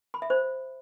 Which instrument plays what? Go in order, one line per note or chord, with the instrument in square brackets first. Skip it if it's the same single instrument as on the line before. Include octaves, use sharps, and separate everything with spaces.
[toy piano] B5
E5
C5